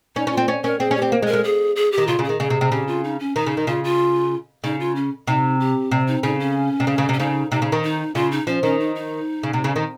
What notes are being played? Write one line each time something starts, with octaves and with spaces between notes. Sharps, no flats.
C#4 D#4
C#4
F4
C4
C#4
C#4 A#4
C4 G#4
C#4
G4
C4
A#3
G#3
A#4
G#3
G#4
G#4
G4
D#3
C#3 F4
C#3
G#4
D#3
C#3 G#4
C3
C3
C#3 G4
F4
D#4
C#4
D#3 D#4
C#3
D#3
C#3 F4
F4
C#3 D#4
F4
C#4
C3 D#4
G4
C3
D#4
C#3 D#4
C#4
C3
C#3
C#3
C3
C#4
C#3 D#4
C3 D#4
C#3
D#3
D#4
C#3 F4
D#4
F3 C#4
D#3 C#4
D#4
D#4
C#3
C3
C#3
D#3